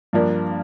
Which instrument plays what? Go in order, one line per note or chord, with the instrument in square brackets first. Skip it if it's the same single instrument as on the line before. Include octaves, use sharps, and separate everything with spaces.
[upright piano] G2 F3 A#3 D4